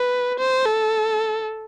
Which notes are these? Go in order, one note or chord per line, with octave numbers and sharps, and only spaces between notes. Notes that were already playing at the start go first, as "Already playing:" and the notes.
Already playing: B4
C5
A4